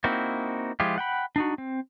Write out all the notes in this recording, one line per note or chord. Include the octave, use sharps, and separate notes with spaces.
A#3 C4 D#4 E4 F#4
F3 G#3 E4 F4 G4
F#5 G5 B5
D4 D#4 F#4
C4